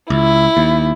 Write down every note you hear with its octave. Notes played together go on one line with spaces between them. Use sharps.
C#2 E4
D#2